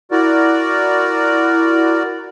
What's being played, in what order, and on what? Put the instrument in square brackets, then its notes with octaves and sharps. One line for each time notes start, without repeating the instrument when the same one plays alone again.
[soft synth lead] E4 [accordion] F#4 A#4 D5